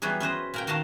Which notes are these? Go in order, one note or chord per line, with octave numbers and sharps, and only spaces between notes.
E3 F#3 G3 B3 F#4 G#4
C#4 B4 C5 D#5
A#2 A#4 G5
D#3 F#4 D#5 F5 A5